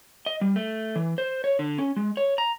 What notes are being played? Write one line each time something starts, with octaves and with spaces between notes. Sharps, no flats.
D#5
G3
A3
E3
C5
C#5
D3
C#4
G#3
C#5
A#5